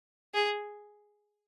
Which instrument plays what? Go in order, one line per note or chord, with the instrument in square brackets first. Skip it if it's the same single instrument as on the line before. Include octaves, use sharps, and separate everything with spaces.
[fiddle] G#4